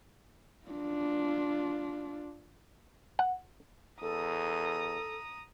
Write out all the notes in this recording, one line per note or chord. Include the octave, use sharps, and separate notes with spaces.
D4 F4
F#5
E2 A4 A#5 D#6